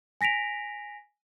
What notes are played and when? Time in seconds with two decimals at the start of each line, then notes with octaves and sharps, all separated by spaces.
0.21 G#5 A#6 B6 D7 F7